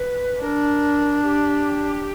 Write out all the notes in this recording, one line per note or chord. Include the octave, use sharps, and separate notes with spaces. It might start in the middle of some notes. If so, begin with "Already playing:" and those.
Already playing: B4
D4 A#4
G4